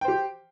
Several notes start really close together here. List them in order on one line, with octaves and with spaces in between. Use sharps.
G5 C5 G4